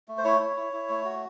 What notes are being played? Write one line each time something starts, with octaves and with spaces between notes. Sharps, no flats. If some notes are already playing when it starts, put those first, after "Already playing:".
A3
C5
E4 C#5
E4
E4
E4
A3
F#4